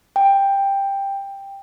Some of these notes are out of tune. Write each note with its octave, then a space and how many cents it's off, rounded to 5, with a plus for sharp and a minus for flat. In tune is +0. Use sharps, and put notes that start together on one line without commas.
G5 +10